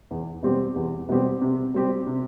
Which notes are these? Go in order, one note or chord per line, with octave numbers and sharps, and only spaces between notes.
E2
B2 G3 C4 G4
E2
B2 G3 C4 G4
C3
G3 C4 G4
C3